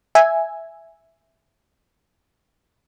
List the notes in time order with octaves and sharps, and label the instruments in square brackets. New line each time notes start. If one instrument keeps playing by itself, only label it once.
[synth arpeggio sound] E5 G#5